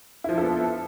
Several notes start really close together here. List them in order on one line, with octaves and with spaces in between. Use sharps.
E4 F3 D4 A4 B3